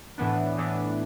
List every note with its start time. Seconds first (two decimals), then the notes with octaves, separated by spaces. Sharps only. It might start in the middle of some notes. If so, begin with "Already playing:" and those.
0.18 A2 E3 B3 D4
0.57 A2 E3 B3 D4